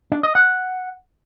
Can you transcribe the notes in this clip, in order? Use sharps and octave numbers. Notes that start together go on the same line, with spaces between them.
D4
D#5
F#5